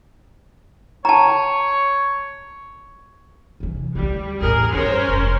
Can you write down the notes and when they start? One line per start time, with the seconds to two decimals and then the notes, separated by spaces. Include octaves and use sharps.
1.05 C#5 A5 A#5
3.60 C3 E3
3.95 D2 G3 C4
4.41 A1 E2 G#4 A#4
4.73 G2 C#4 A#4 C5
5.08 F1